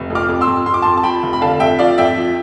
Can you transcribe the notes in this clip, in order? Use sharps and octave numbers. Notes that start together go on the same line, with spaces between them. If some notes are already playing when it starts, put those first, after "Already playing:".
Already playing: F1
F2
D6 F6
F2
C6 E6
F2
F2 C6
D6
F2 A5 C6
A5
F3 G5 B5
F1
B5
D3 F5 A5
F2 E5 G5
F3 D5 F5
F2 E5 G5
F3